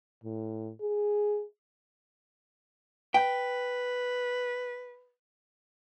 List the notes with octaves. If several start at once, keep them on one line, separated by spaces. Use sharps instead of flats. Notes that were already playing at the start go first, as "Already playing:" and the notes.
A2
G#4
B4 G5